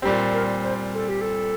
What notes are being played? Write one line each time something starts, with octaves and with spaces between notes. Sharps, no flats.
A#2 G3 C4 G4
A#4
C5
A4
G4
A4